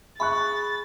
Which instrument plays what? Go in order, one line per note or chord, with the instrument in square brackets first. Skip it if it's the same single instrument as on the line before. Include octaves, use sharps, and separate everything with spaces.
[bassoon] G#4 [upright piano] E5 C#6 F#6 [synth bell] B5 [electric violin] A6